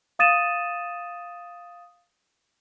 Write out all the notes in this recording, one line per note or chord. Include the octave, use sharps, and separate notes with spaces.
F5 D#6 A6 D#7 E7